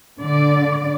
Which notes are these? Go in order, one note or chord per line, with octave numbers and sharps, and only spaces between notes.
D3 D5